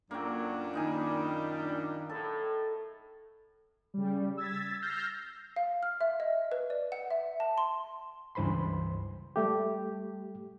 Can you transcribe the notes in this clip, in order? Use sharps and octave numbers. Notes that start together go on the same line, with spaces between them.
F#2 A#2 D3 F#3 A#3 D4 G5
D#3 G3 A#3 D#4 G#5
A2 A4
C#3 G3
E6 G#6 A6 B6
E6 F6 G6 A6 A#6 C7
F5
F6
E5
D#5
B4
D5
F#5
E5
A5
C6
C#2 G2 E3 C5 B5 C6
G3 A3 G4